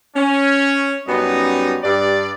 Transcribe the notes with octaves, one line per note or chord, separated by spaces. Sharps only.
C#4
F#2 G3 B3 C#4 D#4 D#5
G2 D5